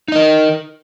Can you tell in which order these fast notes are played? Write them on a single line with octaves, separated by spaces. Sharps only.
D#4 D#5 A#4